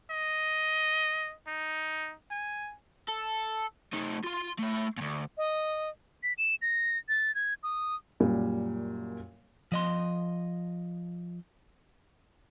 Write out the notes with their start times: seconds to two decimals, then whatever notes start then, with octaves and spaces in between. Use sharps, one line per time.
0.11 D#5
1.47 D#4
2.31 G#5
3.08 A4
3.94 A3 D#4
4.24 F4 C6
4.58 A3 E4
4.98 D2 A#2
5.37 D#5
6.23 B6
6.38 E7
6.62 A#6
7.09 A6
7.35 G#6
7.63 D#6
8.20 F#2 A#2 G3
9.72 F3 D#5 C6